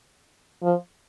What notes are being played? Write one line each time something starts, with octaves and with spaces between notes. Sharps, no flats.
F3